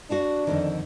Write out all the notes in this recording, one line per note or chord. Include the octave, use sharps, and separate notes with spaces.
D4 F#4 F5 A5
F2 D3 D#3